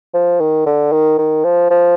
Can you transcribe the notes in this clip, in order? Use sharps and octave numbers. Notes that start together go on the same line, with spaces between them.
F3
D#3
D3
D#3
D#3
F3
F3